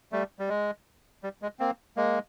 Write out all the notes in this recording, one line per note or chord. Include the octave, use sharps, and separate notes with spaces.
G3 A3
G3
G#3
G3
G#3
A#3 C4
G#3 A#3